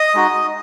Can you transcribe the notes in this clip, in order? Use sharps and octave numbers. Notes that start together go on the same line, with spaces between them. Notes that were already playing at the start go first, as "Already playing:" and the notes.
Already playing: D#5 D#6
G#3 D#4 F#4